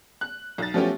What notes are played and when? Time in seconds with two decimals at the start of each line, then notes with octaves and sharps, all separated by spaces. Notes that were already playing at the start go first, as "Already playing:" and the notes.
0.21 F#6
0.58 B1 A6
0.74 F3 F#3 A3 B3 C#4 G4